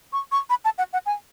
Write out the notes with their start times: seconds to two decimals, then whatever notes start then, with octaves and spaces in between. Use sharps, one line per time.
0.13 C#6
0.32 C#6
0.50 B5
0.65 A5
0.78 F#5
0.93 F#5
1.06 G#5